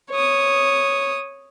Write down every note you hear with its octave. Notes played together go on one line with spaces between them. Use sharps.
C#5 D#6